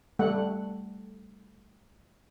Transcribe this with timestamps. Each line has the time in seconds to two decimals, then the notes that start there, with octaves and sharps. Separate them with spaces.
0.19 G3 A3 F#5